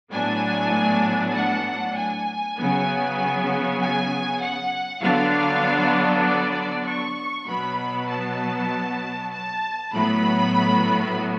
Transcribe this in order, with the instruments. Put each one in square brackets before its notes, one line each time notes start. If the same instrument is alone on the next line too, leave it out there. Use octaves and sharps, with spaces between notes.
[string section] A2 F#3 B3 D4 G#5
F#5
G#5
C#3 F#3 B3
G#5
F#5
D3 F#3 B3 D4 F5
D5
C#6
B2 F#3 B3 B5
A5
A5
A2 F#3 B3 B5